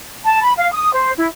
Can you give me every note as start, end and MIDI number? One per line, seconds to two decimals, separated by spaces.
0.24 0.42 81
0.43 0.53 83
0.58 0.70 77
0.72 0.93 87
0.93 1.11 72
1.17 1.28 64